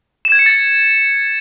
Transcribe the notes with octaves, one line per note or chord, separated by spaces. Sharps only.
E7
G#6
C#7
A6